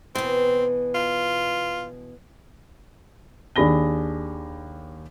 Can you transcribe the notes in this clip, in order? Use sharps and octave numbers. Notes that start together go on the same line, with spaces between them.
B2 E3 C4
F4
D#2 D4 G#4 B5 A#6 G7